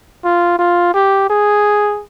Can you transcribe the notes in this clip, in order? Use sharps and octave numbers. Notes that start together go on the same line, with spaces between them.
F4
F4
G4
G#4